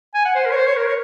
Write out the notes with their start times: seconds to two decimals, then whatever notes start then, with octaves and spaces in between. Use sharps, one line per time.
0.15 G#5
0.25 F#5
0.35 C5
0.46 A#4
0.51 C#5
0.56 C5
0.67 C#5
0.77 A#4
0.87 C#5